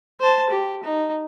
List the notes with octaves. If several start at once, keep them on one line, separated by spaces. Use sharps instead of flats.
C5 A5
G4
D#4